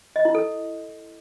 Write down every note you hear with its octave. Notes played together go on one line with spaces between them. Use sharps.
D#5
E4
A4